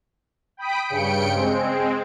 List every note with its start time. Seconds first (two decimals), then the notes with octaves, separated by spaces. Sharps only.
0.57 G5 B5 D#6 B6 D7
0.87 G2 C#3 G5 C#7 D7
1.33 G#3 C4